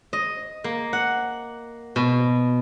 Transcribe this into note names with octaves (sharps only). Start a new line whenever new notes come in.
D#5
A#3
F#5
B2